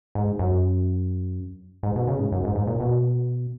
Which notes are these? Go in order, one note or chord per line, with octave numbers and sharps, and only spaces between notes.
G#2
F#2
G#2
B2
C#3
G#2
F#2
G#2
G#2
A#2
B2